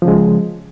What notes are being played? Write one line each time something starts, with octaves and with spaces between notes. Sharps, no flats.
C#3 F3 G#3